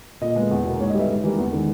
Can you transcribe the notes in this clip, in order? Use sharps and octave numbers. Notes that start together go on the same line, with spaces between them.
A#2 D#5
G#3 B3
E2
B2 A#3
G#2 C#5
D#5
G3 B3 E5
G#2
E3 G3 A#3
E2
D#3 G#3